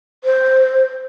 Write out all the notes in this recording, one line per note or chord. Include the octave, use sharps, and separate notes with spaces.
C5